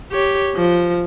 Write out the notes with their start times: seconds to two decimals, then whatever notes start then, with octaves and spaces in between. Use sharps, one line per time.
0.12 G4 C#5
0.55 F3